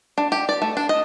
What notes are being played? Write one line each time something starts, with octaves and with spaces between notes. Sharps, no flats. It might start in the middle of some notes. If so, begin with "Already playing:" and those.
D4
G4
D5
A3
D4
D#5